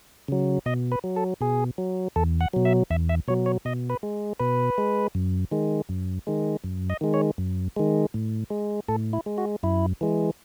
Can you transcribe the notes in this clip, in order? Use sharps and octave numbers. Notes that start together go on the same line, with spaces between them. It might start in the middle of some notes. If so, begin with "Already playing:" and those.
C#3 F#3
B2 D#5
B4
F#3
A4
B2 G#4
F#3
E2 A4
F#5
B2 F#3
E5
E2 E5
E5
B2 F#3 C#5
C#5
B2 D#5
B4
G#3
B2 B4
G#3
F#2
D#3 G#3
F#2
D#3 G#3
F#2
D#5
D#3 G#3
C#5
F#2
D#3 G#3
A2
G#3
A2 A4
E4
G#3
F#4
F#2 E4
E3 G#3